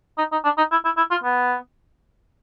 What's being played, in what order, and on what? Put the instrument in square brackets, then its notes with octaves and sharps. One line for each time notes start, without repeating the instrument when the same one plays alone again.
[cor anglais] D#4
D#4
D4
D#4
E4
E4
E4
F4
B3